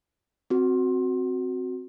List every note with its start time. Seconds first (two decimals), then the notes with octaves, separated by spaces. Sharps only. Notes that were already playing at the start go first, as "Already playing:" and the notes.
0.50 C4 F#4